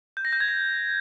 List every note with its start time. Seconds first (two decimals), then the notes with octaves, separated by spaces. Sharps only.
0.17 G6
0.25 A#6
0.33 G6
0.40 G#6
0.48 A#6